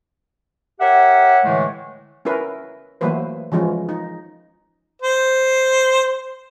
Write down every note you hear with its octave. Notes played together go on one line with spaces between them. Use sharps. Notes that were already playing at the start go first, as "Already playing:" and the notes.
G4 A#4 C#5 E5 F#5
A2 D3 E3 G#3 A3
C#4 E4 A#4 B4
E3 F#3 A3 A#3 B4 C5
E3 F3 G#3 C#4
D#4
C5